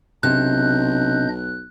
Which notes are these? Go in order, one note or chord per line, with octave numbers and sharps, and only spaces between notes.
B1 C3 D4 D#5 F#6 G6